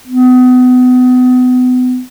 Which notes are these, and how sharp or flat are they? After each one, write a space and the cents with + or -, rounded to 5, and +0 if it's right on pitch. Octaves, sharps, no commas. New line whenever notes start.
B3 +30